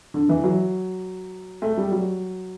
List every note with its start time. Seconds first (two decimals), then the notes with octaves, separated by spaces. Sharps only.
0.14 D3
0.29 E3
0.44 F#3
1.62 A3
1.77 G3
1.92 F#3